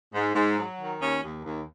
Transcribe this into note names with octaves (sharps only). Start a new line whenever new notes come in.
G#2
G#2
F#3
D#3
D#2 C#4
D#2
D#2